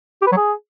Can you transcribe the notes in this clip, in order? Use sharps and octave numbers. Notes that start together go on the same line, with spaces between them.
G4
B4
F#3
G#4